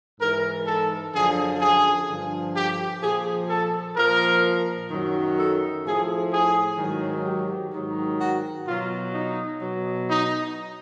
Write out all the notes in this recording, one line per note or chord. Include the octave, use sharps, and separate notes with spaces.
G#2 E3 A#4
A4
F#2 D3 F3 G#4
G#4
G2 D3 F3
G4
A#2 F3 G#4
A4
A#2 F3 A#4
F#2 D#3 F#3
A4
A2 F3 G#4
G#4
G#2 D#3 F#3
G4
G#2 D#3 F#3
F#4
B2 F#3 F4
D#4
B2 F#3
D#4